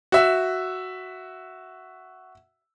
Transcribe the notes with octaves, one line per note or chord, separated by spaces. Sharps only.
F#4 E5